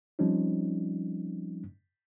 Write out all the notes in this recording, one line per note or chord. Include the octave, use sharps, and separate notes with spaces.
F3 G3 C4 C#4 D#4